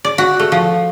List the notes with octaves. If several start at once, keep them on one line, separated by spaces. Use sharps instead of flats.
D5
F#4
A3
F3